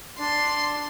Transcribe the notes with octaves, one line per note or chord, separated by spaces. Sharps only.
D4 D5 C6